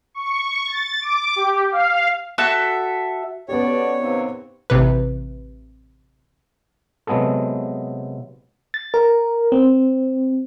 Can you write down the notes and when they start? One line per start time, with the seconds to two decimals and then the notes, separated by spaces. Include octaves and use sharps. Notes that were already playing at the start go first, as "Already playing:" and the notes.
0.14 C#6
0.67 A6
1.01 D6
1.36 G4
1.72 F5
2.38 F#4 A4 E5 A5
3.48 B3 C#4 F#4 G4 A4 C#5 D5
3.99 D#2 C3 C4
4.70 A1 C3 B4
7.07 C3 F#3 G#3 B3 G#4 A4
8.74 A6
8.94 A#4
9.52 C4